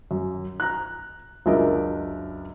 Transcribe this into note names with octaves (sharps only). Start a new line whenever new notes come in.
F#2
A#5 F#6
C#2 F#2 D4 A#4 D#5 E5